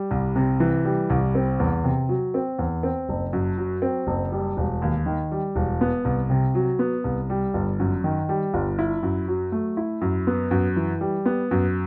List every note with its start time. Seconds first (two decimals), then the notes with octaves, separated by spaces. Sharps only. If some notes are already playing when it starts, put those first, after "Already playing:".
Already playing: G3
0.11 C2
0.36 C3
0.60 E3
0.85 G3
1.10 C2
1.35 C4
1.60 E2
1.84 C3
2.09 F#3
2.34 C4
2.59 E2
2.83 C4
3.09 F#1
3.33 F#2
3.58 F#3
3.82 C4
4.07 F#1
4.32 G3
4.57 E1
4.82 D#2
5.06 D#3
5.32 G3
5.56 E1
5.81 B3
6.05 C2
6.30 C3
6.55 F#3
6.79 B3
7.04 C2
7.30 G3
7.54 G1
7.79 F#2
8.04 D#3
8.29 G3
8.54 G1
8.79 E4
9.03 F#2
9.28 F#3
9.52 A3
9.77 E4
10.01 F#2
10.27 B3
10.51 F#2
10.76 E3
11.01 G3
11.26 B3
11.51 F#2